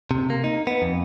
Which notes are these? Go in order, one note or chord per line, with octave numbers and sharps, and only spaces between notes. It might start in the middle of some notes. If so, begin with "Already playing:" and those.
C3
A#3
D#4
B3
F2